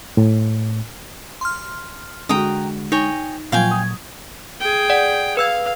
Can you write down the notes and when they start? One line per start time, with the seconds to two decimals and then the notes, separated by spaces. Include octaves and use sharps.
0.17 A2
1.41 C6 F6
2.29 D3 G#3 F#4 G5 A#5 D#6
2.92 D#4 C#5 G5 G#5
3.52 A#2 F3 F#3 F5 G5 G#5 G#6
3.71 D#6
4.60 G#4 G5
4.90 D5 F#5
5.37 B4 F5 E6 G#6